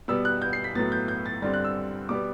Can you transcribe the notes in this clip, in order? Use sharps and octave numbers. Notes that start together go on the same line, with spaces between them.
B2 G3 B3 E6
F#6
G6
C7
B6
A2 F#3 B3 A6
G6
G6
A6
G2 D3 G3 C4 A6
F#6
E6
B2 G3 B3 D6